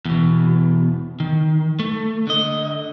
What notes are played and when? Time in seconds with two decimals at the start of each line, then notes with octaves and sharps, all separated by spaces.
0.05 E2 B2
1.20 D#3
1.79 A3
2.27 D3 D#5